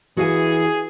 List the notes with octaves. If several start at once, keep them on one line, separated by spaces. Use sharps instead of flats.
E3 F#4 G#4 F5 G#5